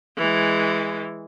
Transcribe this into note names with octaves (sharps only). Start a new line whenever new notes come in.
E3 G#3